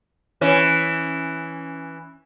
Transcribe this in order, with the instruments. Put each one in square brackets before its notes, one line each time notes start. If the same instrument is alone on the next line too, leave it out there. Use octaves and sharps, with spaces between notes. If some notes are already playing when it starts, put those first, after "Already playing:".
[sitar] E3 C#4